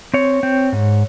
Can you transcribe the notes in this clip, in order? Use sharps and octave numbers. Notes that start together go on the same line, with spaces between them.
C4 C#5
C4
G#2